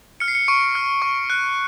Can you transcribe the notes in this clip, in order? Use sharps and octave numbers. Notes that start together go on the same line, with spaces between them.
F6 C#7
C7
C#7
C#6 D7
F6
C#6
F#6